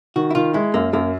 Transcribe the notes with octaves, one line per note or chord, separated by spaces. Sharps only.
D#3 F#4
E4
D#3 F4
G#3 E4
F#2 A#3
F#2 A#3